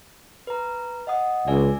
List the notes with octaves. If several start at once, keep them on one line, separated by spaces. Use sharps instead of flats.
B4 A#5
D#5 F#5 D#6
C#2 D5 E5 G#5